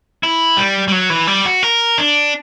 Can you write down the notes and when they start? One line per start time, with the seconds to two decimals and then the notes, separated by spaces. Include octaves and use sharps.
0.23 E4
0.57 G3
0.88 G3
0.92 F#3
1.10 E3
1.27 G3
1.45 F#4
1.63 A#4
1.98 D4